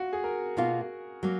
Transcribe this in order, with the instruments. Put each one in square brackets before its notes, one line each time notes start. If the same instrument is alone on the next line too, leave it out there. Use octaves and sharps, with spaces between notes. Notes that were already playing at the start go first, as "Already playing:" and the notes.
Already playing: [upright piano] F4 F#4
G#4
A#4
[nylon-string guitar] B2 A#3 F4
F#3 A#3